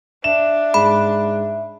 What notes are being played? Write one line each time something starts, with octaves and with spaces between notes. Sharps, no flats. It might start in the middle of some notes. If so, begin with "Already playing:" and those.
D4 E5 E7
G#2 B5